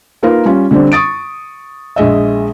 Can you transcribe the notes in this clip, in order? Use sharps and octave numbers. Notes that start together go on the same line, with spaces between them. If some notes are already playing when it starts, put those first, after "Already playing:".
A#3 D#4 F4 A#4 B4
G3 C#4 F4
D3 G3 C4 D4
C#6 D#6 A6 D7
A#1 G#3 D#5 E5